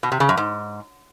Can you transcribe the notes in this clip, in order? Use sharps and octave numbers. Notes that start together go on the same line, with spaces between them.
B2
C3
C#3
F#2
G#2